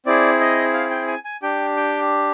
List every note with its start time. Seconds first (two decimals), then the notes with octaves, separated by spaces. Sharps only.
0.06 C4 E4 G#4 D5
0.40 D#5
0.73 F5
0.90 G5
1.07 G#5
1.25 G#5
1.42 D4 G4 G5
1.77 G5